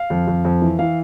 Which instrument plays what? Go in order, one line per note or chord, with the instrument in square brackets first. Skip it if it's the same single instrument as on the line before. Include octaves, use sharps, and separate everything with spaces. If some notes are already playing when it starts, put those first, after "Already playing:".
Already playing: [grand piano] F5
F2
F2
F2
E3
E3 F5